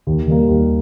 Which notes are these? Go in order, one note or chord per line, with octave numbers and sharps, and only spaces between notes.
D#2
D#3 G3 A#3
D#2